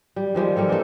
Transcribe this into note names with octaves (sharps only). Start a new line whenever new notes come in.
G3
D#3 F3 G3 G#3
G3 A#3 A4 C#5
E3 D4 D#4 A4